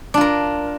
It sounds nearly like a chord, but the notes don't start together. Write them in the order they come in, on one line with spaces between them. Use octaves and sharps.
D4 F4 A#4